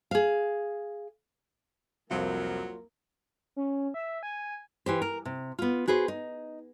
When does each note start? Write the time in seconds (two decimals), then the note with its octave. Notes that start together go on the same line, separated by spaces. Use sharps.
0.11 G#4 F5
2.11 C2 F2 F#3 A#3 F4 A#4 C5
3.56 C#4
3.94 E5
4.23 G#5
4.86 E3 G4 C5
5.02 A#4
5.25 C3
5.59 B3 F4
5.87 F#4 G#4 B4 C5
6.08 D#4